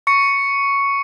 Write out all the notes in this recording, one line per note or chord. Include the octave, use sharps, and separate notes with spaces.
C#6 C#7